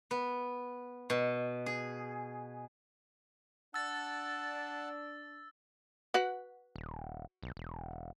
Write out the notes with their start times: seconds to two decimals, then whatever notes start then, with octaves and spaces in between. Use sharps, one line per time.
0.11 B3
1.10 B2
1.66 G#4
3.74 D4 F#5 A5 E6 A6
6.14 F#4 B4 F#5
6.76 D#1
7.42 B1
7.57 E1